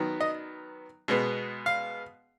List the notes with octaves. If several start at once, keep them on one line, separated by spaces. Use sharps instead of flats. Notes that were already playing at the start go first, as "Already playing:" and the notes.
Already playing: D#3 F#3 B3
D#5
B2 G#3 B3
F5